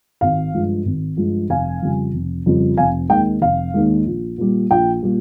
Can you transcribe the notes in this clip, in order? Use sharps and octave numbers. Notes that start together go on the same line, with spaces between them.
G#1 F5
G2 F3 G#3
G#1
G2 F3 G#3
F1 F5 G#5
F2 C#3 G3
F1
F2 C#3 G3
F1 F5 G#5
D#2 D#3 G#3 G5
F1 F5
D#2 D#3 G#3
A#1
A#2 G3
A#1 G5
A#2 G3